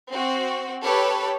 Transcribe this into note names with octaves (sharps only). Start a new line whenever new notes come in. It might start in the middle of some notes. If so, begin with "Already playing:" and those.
C4 F#4
G4 A4 B4 C#5